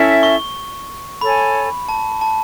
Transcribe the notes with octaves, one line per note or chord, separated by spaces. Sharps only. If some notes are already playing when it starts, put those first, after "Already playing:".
Already playing: C#4 E4 A4 E5
C#6
A4 C#5 G#5 B5
A5
A5